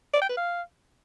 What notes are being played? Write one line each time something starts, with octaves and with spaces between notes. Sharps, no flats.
D5
G5
B4
F5